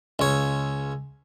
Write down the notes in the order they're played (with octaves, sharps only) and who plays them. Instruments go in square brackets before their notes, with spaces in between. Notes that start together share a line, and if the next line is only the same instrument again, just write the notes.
[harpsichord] C#2 C#5